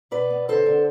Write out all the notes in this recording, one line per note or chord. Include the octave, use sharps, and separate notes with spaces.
B2 B4 D5
B3
D3 A4 C5
D3